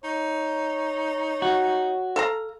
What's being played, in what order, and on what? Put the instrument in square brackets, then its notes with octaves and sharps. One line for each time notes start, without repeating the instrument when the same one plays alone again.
[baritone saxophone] D#4 [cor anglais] C#5
[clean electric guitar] F#4
[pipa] A4 F5 A#5